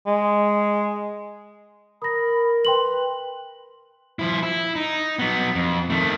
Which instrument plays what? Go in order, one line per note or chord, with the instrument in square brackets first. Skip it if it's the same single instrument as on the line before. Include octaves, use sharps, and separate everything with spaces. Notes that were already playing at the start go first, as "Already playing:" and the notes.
[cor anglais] G#3
[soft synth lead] A#4 [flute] B5 [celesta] D#6 A#6
[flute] B4 [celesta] G5 C6 F#7
[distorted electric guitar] F3 E4
E4
D#4
F#3 B3
F2
D#3 A3